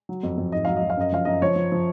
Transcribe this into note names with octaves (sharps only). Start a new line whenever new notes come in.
F#3
F2
F2
G#2 D#5
F#3 F5
D#5
F#3
F5
F#2 D#5
F3 F5
F#2 D#5
F3 C#5
F3
F3